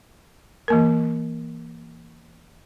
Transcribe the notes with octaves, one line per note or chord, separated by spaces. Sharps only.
E3 A#3 A#4